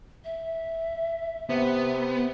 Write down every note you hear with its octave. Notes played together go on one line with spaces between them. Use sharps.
E5
C3 B3